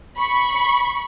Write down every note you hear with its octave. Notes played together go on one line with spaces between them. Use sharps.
B5 C#6